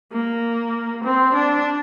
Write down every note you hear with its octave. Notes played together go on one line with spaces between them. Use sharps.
A#3
C4
D4